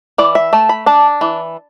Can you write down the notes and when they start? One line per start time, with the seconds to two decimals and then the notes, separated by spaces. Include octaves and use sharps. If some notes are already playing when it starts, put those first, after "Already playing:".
0.18 E3 D5
0.35 E5
0.53 A3 A5
0.69 B5
0.86 D4 A5
1.21 E3